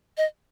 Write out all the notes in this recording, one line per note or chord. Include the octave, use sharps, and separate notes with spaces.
D#5